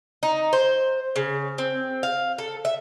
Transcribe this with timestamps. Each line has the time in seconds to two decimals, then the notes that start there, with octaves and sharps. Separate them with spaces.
0.23 D#4
0.53 C5
1.16 C#3
1.58 C4
2.03 F5
2.38 A4
2.65 E5